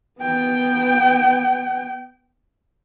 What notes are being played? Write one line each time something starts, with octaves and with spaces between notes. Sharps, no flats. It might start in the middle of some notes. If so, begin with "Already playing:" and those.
B3 G5